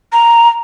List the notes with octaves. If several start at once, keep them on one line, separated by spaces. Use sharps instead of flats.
A#5